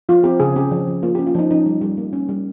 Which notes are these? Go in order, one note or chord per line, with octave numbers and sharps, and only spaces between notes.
F3 F4
C4 G4
C#3 G#4
C#4 G4
F3
F3
A#3 F4
C#4 G4
F4
F3 D#4
C#4 D#4
G3
G3
A#3
C#4
G3